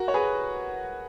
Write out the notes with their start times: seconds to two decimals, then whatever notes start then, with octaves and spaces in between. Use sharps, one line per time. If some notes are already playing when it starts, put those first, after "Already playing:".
Already playing: F#4 A#4
0.08 C#5
0.14 G#4 B4